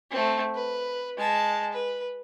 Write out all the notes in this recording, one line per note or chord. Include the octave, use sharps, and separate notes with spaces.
A3 C4
B4
G#3 A5
B4